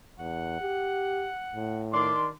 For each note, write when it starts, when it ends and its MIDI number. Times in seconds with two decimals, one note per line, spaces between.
0.19 0.59 40
0.19 1.83 78
0.61 1.29 67
1.55 2.12 45
1.93 2.28 51
1.93 2.29 62
1.93 2.28 74
1.93 2.28 84